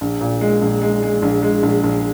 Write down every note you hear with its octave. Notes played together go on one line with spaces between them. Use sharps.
A#1
A#2
G#3
A#1
G#3
G#3
A#1
G#3
A#1
A#1